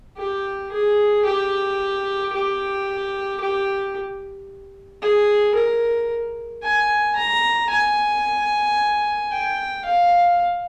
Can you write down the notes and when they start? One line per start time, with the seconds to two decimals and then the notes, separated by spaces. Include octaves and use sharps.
0.17 G4
0.72 G#4
1.25 G4
2.32 G4
3.40 G4
5.02 G#4
5.55 A#4
6.62 G#5
7.16 A#5
7.70 G#5
9.31 G5
9.85 F5